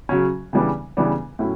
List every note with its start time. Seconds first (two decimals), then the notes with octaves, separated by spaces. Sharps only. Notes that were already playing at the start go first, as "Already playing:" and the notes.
0.09 C#3 F#3 C#4
0.53 C#3 E3 G3 B3 D4
0.97 C#3 E3 G3 B3 D4
1.39 A2 F#3 C#4 E4